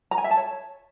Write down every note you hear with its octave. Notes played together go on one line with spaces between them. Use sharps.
A#5
G#5
E5
A5
C#5